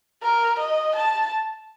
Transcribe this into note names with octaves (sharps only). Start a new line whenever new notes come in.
A#4
D#5
A5